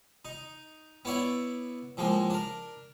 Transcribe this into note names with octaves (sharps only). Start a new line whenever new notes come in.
D#4
B3 E4 C#5 D5 E5
A2 F3 G#3 A#3
D4 A#4